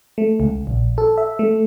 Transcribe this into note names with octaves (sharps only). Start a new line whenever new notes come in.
A3
C#2
A#1
A4
E5
A3